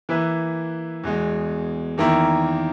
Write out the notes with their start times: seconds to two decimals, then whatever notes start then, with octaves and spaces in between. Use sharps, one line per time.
0.09 E3 A#3 E4 B4
1.04 E2 B2 G#3
1.98 E2 D#3 A#3 E4 A#4